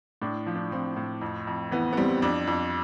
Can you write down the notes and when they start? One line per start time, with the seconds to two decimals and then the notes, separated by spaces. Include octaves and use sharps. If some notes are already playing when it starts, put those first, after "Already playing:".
0.21 A2 D4
0.46 F3
0.55 D4
0.72 F3 C4
0.96 A2
1.21 F2
1.47 F2
1.72 E3 B3
1.93 B3
1.97 G3 C4
2.22 F2 D4
2.47 F2